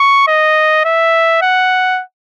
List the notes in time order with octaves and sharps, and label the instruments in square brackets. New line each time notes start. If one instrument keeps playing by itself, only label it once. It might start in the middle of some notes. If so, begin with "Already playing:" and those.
Already playing: [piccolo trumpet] C#6
D#5
E5
F#5